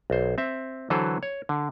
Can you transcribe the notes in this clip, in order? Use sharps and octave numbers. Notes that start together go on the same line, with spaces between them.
B1 C5
C4 E5
D3 E3 F#3 A4 B4 C5
C#5
D3